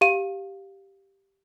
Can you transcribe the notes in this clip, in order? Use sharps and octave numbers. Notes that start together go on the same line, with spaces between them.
G4 F5 D#7